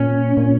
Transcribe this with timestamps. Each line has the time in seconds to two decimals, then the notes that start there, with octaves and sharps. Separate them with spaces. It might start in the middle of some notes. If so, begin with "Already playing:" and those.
Already playing: A#2 C#4
0.37 A#2